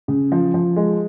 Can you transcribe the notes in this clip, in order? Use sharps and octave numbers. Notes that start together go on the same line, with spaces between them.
C#3
F3
F3
G#3